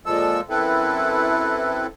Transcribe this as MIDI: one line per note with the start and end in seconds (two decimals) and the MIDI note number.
0.06 0.41 46
0.06 0.41 53
0.06 0.41 56
0.06 0.41 69
0.06 0.41 88
0.49 1.87 42
0.49 1.87 60
0.49 1.87 64
0.49 1.87 69
0.49 1.87 71